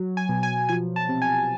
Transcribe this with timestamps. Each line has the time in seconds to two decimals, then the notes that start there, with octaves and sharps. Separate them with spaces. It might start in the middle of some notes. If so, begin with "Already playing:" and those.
Already playing: F#3
0.17 G#5
0.29 B2
0.43 G#5
0.69 F3 G#5
0.96 A5
1.09 C3
1.22 G#5